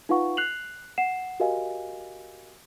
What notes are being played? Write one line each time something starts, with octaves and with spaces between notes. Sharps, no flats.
D#4 F4 B4 F5 F#5 C#6
F#6 C7 F7 F#7
F#5 C7 E7
F#4 G4 A#4 D#5 F5 G#5